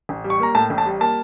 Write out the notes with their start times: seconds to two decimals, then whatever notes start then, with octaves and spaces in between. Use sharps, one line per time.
0.09 A1
0.24 G3
0.30 C#6
0.40 A#3 A#5
0.55 A2 A5
0.70 A1
0.78 A5
0.86 G3
1.01 A#3 A5